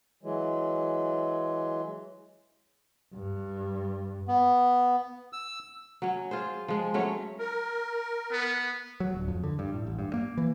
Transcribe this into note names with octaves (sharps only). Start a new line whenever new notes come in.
E3 F#3 G#3
G2
B3
E6
F#3 C#4
F4 G#4 C5
F3 G#3
F#3 A3 C#4 C#5
A#4
B3
F#3
D1
F2
D3
G2
A2
A1
G2
A#3
E3